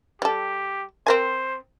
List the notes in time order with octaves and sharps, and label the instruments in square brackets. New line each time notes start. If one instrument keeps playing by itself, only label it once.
[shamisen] G3 A4 [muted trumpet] G4
[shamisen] C4 A#4 G#5 [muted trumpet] C5